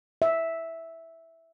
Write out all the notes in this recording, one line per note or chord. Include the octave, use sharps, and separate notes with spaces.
E5